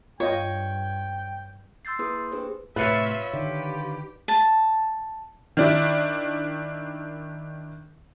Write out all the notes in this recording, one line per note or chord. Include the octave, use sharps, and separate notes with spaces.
G2 F4 C#5 D#5 G5
C6 E6 G6 A6 C7
A#3 E4 G#4 B4 C6 D#6
D4 G4 G#4 B4 C5
A2 C3 F4 B4 C#5 E5 F#6 C#7
D3 D#3 G4
A5
D#3 D4 E4